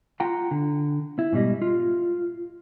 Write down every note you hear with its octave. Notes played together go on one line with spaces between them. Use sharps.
F4 F#5 G5 A#5
D3
E4
G#2 B2 G3 D#5
F4